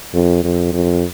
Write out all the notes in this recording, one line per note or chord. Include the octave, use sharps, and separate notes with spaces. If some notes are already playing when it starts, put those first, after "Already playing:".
F2
F2
F2